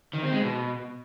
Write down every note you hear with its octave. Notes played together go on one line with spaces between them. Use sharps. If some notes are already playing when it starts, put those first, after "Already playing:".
D#3
C4
G#3
B2